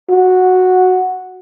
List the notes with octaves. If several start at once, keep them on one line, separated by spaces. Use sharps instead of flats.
F#4